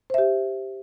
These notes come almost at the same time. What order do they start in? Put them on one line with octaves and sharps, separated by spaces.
C5 E5 G4